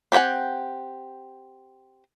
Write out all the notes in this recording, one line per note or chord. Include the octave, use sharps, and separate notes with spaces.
C4 G4 C#5 F#5 G#5